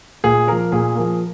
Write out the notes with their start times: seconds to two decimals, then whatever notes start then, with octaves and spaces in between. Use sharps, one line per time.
0.24 A#2 G#4
0.47 F3 A#3 A#4
0.72 A#2 G#4
0.95 F3 A#3